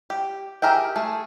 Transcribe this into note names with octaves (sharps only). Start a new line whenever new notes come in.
G4
G4 G#4 A#4 E5 G5
A3 G#4